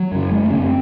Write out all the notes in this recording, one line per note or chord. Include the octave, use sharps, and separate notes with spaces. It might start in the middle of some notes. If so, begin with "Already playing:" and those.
Already playing: F#3
F#2 C#3
F#1 G#3
A3
F#2 C#3 C#4
C4